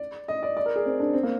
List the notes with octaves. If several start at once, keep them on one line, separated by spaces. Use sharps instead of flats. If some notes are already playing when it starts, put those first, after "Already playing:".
Already playing: D5
D#5
D5
D5
A#4
G#4
C4
D4
C4
A#3